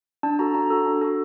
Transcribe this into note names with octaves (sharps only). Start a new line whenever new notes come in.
D4 A5
F#4 A4 A#5
D4 A#5
F#4 A4
D4
F#4 A4